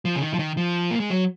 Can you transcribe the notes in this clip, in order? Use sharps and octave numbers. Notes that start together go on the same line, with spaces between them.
F3
C#3
D#3
F3
D#3
F3
A#3
G#3
F#3